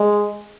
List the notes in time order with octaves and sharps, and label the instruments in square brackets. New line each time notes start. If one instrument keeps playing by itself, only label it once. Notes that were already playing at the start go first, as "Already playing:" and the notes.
Already playing: [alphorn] G#3